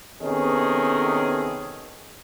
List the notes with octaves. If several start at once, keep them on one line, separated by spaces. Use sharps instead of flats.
C3 D#3 B3 C#4 G#4 A4